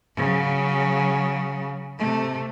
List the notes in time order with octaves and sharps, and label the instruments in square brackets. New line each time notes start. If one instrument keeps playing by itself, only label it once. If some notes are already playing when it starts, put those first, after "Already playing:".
[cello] C#3 F#3
C3 A3